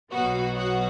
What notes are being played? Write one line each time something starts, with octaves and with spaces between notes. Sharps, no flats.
B1 B2 F#3 B3 F#4
F#4